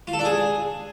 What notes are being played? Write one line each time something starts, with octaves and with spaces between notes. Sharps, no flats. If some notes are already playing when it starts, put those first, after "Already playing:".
F4
A4
D4
G#4